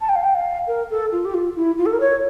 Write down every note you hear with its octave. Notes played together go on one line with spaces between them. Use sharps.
A5
G5
F5
G5
F5
A#4
A4
F4
G4
F4
E4
F4
A4
A#4
C#5